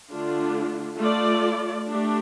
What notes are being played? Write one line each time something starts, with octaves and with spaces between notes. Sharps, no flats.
D3 A3 D4 F4
A3 F4 D5
A3 D4 G4